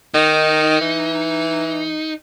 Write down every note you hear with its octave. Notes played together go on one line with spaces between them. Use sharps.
D#3 D#4
E3